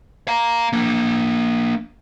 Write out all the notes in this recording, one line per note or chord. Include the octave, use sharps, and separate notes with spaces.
F5 A#5
A#3 D4